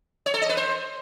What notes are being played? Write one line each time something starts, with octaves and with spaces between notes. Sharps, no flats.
C#5
A4
D#5
B4
C5